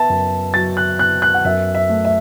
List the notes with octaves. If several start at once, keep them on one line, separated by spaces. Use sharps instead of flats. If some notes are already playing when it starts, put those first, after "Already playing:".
Already playing: B3 E5 A5
F#2
F#3 A6
F#6
B3 F#6
F#6
F#5
F#2 E5
E5
A3
E5